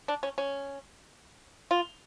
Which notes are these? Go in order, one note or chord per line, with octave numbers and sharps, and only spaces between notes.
D4
C#4
C#4
F4